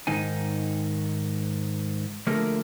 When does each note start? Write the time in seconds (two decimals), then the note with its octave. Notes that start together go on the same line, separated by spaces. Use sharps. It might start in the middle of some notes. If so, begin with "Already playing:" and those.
0.07 G#2 D#3 D#4 G#5
2.27 D3 F3 A3 A#3 G#4 A#4